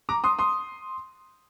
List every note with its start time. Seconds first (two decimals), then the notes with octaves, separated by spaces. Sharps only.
0.09 A#5 D6
0.24 C6 D#6
0.39 C6 D#6